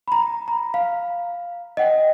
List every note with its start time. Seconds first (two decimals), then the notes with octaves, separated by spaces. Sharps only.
0.08 A#5 B5
0.48 A#5
0.74 F5
1.77 D#5 F#5 G5